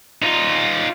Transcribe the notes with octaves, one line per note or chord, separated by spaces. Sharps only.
D#4 F4